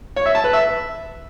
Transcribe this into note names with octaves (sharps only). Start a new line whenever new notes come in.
C#5
E5
A5
B4
E5